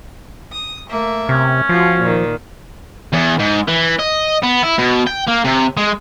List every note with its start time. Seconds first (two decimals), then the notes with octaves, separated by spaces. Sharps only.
0.52 D#6
0.88 A3 A#3 E5
1.29 C3 C#4
1.69 F3 F4 F#4
1.99 A#2 D#3
3.13 E2
3.40 G#2
3.68 E3
3.99 D#5
4.43 B3
4.63 E4
4.78 B2
5.07 G5
5.28 A#3
5.45 C3
5.77 G#3